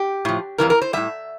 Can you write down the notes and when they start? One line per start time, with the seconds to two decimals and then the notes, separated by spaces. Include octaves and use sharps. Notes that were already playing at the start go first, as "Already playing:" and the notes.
Already playing: G4
0.25 A2 F3
0.58 F2 C3 E3 G3 A#4
0.70 A#4
0.82 C5
0.93 A2 G3 E5